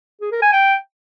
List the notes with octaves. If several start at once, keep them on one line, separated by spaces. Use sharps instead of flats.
G#4
A#4
G#5
G5